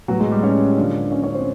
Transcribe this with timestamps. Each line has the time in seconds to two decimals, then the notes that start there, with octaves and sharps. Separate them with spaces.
0.08 A2 F#3 B3 F#4
0.20 G#3 G#4
0.32 G3 G4
0.43 C#4 C#5
0.77 D3 F3 A#3 D4 D5
1.12 C#4 C#5
1.23 C#4 C#5
1.35 C4 C5